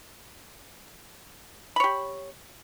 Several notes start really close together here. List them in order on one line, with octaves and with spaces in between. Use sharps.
B5 C#5 G4